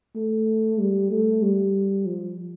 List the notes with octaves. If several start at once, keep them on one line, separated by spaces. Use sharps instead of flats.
A3
G3
A3
G3
F3